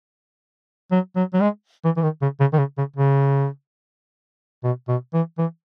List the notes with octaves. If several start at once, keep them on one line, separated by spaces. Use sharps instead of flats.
F#3
F#3
F#3
G#3
E3
E3
D#3
C#3
C#3
D#3
C#3
C#3
C#3
B2
B2
E3
E3